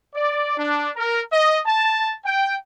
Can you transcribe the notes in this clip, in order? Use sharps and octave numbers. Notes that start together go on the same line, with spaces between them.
D5
D4
A#4
D#5
A5
G5